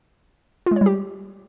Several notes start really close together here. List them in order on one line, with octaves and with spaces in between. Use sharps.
F4 G#3 C#5 G3 G4